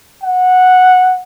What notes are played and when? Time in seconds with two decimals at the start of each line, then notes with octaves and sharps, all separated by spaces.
0.24 F#5